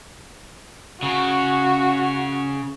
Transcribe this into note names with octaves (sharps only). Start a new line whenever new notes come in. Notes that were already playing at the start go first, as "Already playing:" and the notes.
C#3 F#4